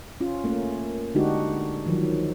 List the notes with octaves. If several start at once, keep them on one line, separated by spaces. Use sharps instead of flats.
C#4 F4
A3 A#3 C#4
D3 G#3 D4 D#4 F#4 G4
D#3 F3 F#3